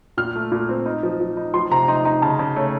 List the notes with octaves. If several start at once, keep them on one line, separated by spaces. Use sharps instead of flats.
A#2 F6
A3
A#2
C4
D#4
F3
F3
D#4
F3 C6
C3 A#5
D#4 C6
D#4 A#5
C#3 A5
C#3
A3 C#5